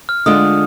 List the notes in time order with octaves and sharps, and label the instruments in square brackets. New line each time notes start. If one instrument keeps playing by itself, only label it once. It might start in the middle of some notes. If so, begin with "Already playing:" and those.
[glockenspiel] F6
[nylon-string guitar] D3 G#3 D4 F4 [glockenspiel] D#6